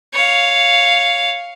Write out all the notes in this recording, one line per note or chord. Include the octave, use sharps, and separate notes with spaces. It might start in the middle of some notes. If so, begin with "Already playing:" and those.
C#5 F5